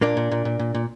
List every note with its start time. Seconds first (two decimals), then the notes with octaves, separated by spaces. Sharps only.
0.01 A#2 A#3 D4
0.17 A#2
0.32 A#2
0.45 A#2
0.59 A#2
0.75 A#2